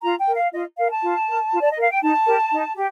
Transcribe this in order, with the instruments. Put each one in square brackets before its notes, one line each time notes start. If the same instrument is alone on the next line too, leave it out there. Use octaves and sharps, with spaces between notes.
[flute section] F4 A#5
G5
A#4
F5
F4 D#5
A#4 F5
A5
F4
A#4
F4
D5
D#5
A#4 F5
G5
D#4 A5
G4 A#4
D#4
G4